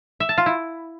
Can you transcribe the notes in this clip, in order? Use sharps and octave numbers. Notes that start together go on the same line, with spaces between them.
E5
A5
F4
E4